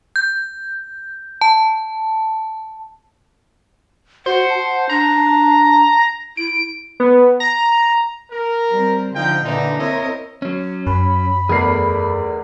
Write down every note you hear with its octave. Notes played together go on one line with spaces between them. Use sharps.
G6
A5
F#4 C5 F#5
A5
D4 A#5
E4 D7
B3
A#5
A#4
G3 C4
D3 F3 D#4 F4 G5
A#2 D3 E3 D4 D#4
C4 E4 A#4 C#5 D#5
F#3 C#4
F#2 B5
E2 A3 G#4 A#4 D5 C7